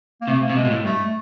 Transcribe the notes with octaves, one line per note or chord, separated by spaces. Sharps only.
A#3
C3 A3
A#3
C3
B2 G#3
A#2
A2
G2 A3